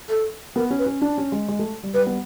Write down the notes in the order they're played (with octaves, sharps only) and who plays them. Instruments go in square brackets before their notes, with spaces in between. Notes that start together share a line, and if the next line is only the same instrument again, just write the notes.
[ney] A4
[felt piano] B3 [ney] A#4
[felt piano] C#4
[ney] B4
[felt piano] C#4
D4
C#4
G#3
G#3
A3
G3
[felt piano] G3 [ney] B4
[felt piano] B3